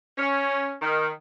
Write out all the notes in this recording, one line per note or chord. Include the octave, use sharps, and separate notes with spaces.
C#4
D#3